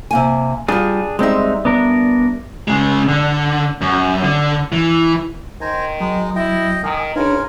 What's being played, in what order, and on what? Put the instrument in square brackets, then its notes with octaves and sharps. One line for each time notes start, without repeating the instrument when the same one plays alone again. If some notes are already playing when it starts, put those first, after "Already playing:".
[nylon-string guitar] C3 A#3 G#5
[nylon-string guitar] G3 F4 [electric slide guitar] D4 G#4
[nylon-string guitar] G3 E5 [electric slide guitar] G#3 C4 D#4
[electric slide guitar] B3 D4 A#4
[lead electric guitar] C#3 G#3
D3
F#2
D3
E3
[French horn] D#3 [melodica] C5 G#5 A#5
[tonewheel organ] F#3 [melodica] G#3 D#4
[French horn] E4 [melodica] D#5 G5
[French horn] D#3 [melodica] F5 [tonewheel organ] G#5 D#6
[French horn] C#3 [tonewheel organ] D4 D#4 B4 [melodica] F4 A#4 G#5